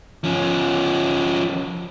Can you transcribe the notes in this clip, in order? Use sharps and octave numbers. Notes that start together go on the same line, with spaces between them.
F3 C#4